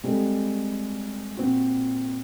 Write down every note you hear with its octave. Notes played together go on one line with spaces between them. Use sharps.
G3 G#3 C4 G4 A4
A#2 C4 F#4